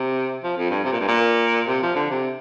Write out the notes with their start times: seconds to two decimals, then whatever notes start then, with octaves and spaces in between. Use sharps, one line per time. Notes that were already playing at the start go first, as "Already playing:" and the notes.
Already playing: C3
0.44 F3
0.57 F2
0.71 G2
0.84 C3
0.92 A#2
1.00 G2
1.08 A#2
1.68 C3
1.82 F3
1.96 D3
2.11 C3